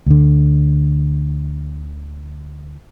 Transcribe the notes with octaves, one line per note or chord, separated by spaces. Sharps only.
D2 D3